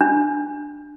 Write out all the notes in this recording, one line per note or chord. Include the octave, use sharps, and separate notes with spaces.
D4